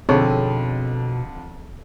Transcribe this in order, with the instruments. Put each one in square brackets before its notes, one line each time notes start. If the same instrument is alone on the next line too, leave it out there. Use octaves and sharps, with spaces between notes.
[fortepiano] F2 D3 [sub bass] B2 [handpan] C4 A4 [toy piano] D#4 G#4 C#5